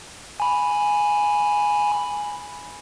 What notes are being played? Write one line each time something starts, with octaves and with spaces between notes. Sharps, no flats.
G#5 B5